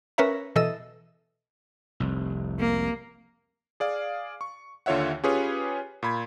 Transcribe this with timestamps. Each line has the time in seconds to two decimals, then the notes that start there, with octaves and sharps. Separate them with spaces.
0.18 C#4 A#4 B4 C#5 E5 A#5
0.56 B2 E3 A4 D#5 E6
2.00 F1 C2
2.60 A#3
3.80 G#4 D5 F5
4.41 C#6
4.86 D#2 D3 F4 C#5 E5 F#5
5.24 C#4 F4 G4 G#4 B4 C#5
6.03 A#2 B5 G#6